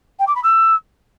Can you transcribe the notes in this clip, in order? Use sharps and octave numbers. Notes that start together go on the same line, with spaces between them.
G5
D6
B5
E6